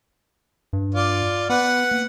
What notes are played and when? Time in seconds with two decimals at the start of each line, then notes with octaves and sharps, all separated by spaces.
0.73 G2
0.94 F4 D5
1.49 B3 B4 F#5
1.91 A#3